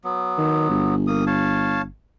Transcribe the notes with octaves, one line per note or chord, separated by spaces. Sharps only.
F#3 B3
D#3
G1
A#3 D#6
C#5 F5 A5